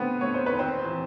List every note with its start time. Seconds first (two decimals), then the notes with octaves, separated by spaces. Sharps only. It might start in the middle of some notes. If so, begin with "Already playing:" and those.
Already playing: D3 A3 B3 C4 B4
0.21 A3 C#5
0.34 C5
0.46 B4
0.53 D#2
0.59 C4 C5
0.84 E3